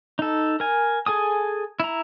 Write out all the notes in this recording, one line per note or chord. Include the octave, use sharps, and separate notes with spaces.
D#4 A4
A#4 G#5
G#4 A4 G#5 D#6
E4 A#5